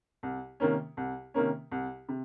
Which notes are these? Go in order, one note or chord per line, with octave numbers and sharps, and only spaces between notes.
C2
C3 D#3 A#3 C#4
C2
C3 D#3 A#3 C#4
C2
C3